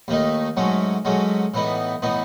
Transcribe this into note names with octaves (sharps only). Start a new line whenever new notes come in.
D#2 D#3 A3 D#4
G#2 F#3 A3 C#4
G#2 F#3 A3 C#4
A2 E3 B3 D#4
A2 E3 B3 D#4